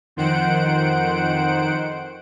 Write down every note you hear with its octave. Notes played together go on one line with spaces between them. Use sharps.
F2 D#3 C5 F#5 D7